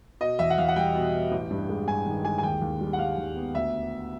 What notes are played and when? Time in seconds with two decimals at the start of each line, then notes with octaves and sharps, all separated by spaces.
0.20 B2 D#5
0.39 E2 E5
0.50 F#5
0.58 E2 F5
0.68 F#5
0.76 G3 G5
0.95 B2
1.13 B2
1.32 A1
1.50 G2
1.69 G#3
1.87 G2 G#5
2.06 D#3
2.25 G#3 G#5
2.38 G#5
2.43 D#2 G5
2.61 D#2
2.81 G3
2.93 F#5
2.99 G3 F5
3.18 D#2
3.36 B3
3.55 D2 E5